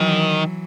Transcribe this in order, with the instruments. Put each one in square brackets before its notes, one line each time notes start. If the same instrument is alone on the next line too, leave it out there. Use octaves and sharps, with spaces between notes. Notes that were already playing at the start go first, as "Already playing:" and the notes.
Already playing: [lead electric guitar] D#3 [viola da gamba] E3 F#3